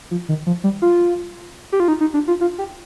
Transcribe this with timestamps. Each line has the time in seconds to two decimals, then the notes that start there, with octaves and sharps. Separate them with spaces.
0.11 F3
0.29 D#3
0.47 F3
0.64 G3
0.82 F4
1.72 G4
1.80 F4
1.88 D#4
2.01 D#4
2.14 D4
2.28 F4
2.41 F4
2.58 G4